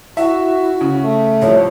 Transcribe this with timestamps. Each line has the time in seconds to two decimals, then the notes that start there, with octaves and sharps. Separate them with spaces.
0.17 E4 F#4 E5
0.81 C#3
1.02 A3
1.42 C2 F3 C#5